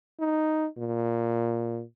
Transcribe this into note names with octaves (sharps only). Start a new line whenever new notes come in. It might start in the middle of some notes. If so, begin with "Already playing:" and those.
D#4
A#2